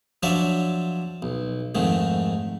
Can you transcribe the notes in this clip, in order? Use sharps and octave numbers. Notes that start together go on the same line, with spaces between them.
F3 F#3 D4 C#5 D5 E5
B1
F2 G#2 D#3 A3